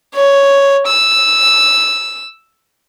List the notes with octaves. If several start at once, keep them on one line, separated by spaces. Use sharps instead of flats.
C#5
E6